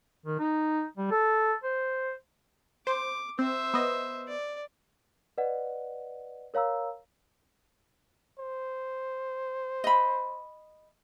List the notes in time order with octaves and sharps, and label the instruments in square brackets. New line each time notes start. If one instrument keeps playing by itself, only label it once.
[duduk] D#3
D#4
G3
A4
C5
[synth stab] C5 [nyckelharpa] D6
[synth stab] C4 [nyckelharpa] C5 E5
[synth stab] B3 D#5
[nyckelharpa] D5
[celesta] B4 D5 D#5 F#5
A#4 C#5 F5 A#5 E6
[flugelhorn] C5
[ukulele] D#5 B5